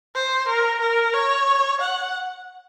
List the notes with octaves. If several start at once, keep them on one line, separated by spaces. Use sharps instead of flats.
C5
A#4
A#4
C#5
F#5